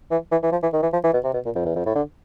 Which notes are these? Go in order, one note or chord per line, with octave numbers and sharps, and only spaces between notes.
E3
E3
E3
F3
E3
D#3
E3
F3
E3
B2
C3
B2
A#2
F2
E2
F2
A2
D3